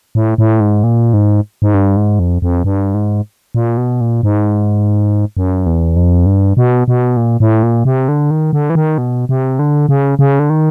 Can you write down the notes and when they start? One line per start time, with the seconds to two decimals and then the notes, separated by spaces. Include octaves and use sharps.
0.15 A2
0.38 A2
0.60 G#2
0.84 A#2
1.14 G#2
1.62 G#2
1.74 G2
1.97 G#2
2.19 F2
2.42 F2
2.64 G2
2.94 G#2
3.55 A#2
3.77 B2
4.01 A#2
4.23 G#2
5.37 F#2
5.66 E2
5.96 F2
6.26 G2
6.57 B2
6.88 B2
7.17 A#2
7.40 A2
7.63 A#2
7.85 C3
8.08 D3
8.31 D#3
8.53 D3
8.70 E3
8.75 D#3
8.98 B2
9.29 C3
9.59 D3
9.89 C#3
10.19 C#3
10.39 D3
10.50 D#3